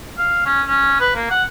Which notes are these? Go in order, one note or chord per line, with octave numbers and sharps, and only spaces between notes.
F5
C#4
C#4
B4
A#3
F#5